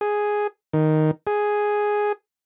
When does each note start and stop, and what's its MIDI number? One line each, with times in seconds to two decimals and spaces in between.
0.01 0.47 68
0.73 1.11 51
1.27 2.12 68